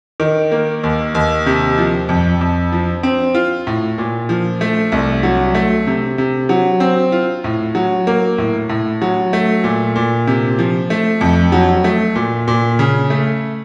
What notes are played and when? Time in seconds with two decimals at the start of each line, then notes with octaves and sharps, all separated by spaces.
0.20 D#3
0.52 A#3
0.84 D#2
1.15 D#2
1.46 C3
1.78 F3
2.09 F2
2.41 F2
2.72 F3
3.03 C4
3.35 F4
3.67 A2
3.98 A#2
4.29 F3
4.61 A3
4.92 C2
5.23 F#3
5.55 A3
5.87 C3
6.18 C3
6.49 F#3
6.80 C4
7.12 F4
7.44 A2
7.75 F#3
8.07 A#3
8.38 A2
8.69 A2
9.02 F#3
9.33 A3
9.64 A#2
9.96 A#2
10.27 C3
10.59 F3
10.90 A3
11.21 F2
11.52 F#3
11.84 A3
12.15 A#2
12.48 A#2
12.79 C#3
13.10 A3